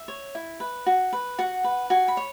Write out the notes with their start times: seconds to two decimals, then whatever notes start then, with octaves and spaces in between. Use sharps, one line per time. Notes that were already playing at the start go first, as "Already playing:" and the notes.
Already playing: E5
0.08 C#5
0.35 E4
0.60 B4
0.86 F#4
1.13 B4
1.38 F#4 F#5
1.64 B4
1.90 F#4 G#5
2.08 B5
2.17 C#5